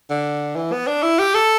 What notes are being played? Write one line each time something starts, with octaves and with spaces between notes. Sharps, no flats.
D3
E3
B3
D4
E4
G4
A4